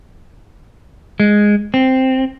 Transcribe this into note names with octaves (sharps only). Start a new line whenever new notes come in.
G#3
C4